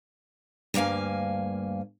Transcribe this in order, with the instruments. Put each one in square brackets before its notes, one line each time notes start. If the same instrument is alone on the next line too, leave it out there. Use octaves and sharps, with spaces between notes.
[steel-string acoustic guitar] D2 G2 A#3 F5 G#5